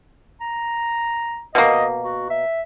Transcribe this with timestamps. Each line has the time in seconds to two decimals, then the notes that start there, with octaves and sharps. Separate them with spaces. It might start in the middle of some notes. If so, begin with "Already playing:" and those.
0.41 A#5
1.55 B2 A#3 D#5
2.03 F#4
2.30 E5